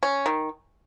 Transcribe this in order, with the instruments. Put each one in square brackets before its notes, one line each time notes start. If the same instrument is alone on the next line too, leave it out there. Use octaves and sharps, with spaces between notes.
[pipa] C#4
D#3